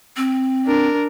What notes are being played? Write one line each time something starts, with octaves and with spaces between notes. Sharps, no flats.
C4
D4 A#4